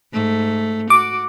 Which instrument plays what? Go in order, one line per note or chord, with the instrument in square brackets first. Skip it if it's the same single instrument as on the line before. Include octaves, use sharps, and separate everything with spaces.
[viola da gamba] G#2 A3
[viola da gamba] F#4 [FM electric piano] D6